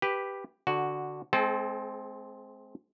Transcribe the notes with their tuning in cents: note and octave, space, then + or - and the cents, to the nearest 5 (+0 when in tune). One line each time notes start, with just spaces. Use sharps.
G4 +0 B4 +0
D3 +0 F#4 +0
G#3 +25 C4 +0 A4 -35